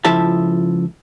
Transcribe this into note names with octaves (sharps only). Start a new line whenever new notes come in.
C#2 F3 E4 A4 E5 A5